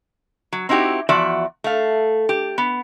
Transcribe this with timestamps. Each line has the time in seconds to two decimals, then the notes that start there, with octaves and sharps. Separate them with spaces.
0.52 F#3
0.69 C4 D#4 E4 F#4 G4
1.09 E2 F3 F#4 D5 E5
1.64 A3 F5
2.29 G4
2.58 B3